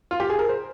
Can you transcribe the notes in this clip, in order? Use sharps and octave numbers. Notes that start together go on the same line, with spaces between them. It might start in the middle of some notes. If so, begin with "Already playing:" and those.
F4
G4
G#4
A#4
C5